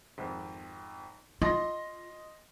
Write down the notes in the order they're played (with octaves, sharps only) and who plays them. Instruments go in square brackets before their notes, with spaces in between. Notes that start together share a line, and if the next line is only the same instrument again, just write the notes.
[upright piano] G#1 F2
[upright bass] F4 [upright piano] D#5 C6 A#6